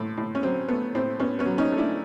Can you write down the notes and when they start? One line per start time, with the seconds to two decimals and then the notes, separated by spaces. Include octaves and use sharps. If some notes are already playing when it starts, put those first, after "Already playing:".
Already playing: A2 A3
0.17 A2
0.35 C#4
0.43 F#3 C4
0.69 A3 B3
0.95 A2 C4
1.20 A2 B3 C#4
1.39 B3 C#4
1.46 F#3
1.58 C#4 D#4
1.72 A3
1.78 D4 E4